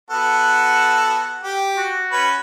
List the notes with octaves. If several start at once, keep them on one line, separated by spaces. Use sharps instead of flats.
B3 F#4 A4 F#5
G4
F#4
C#4 B4